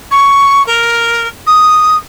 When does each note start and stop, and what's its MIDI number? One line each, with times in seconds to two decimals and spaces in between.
0.11 0.65 85
0.67 1.28 70
1.47 1.97 87